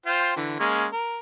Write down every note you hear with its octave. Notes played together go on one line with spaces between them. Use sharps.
F4 C5 G5
D3 E3
G#3 A#3 C#4
A#4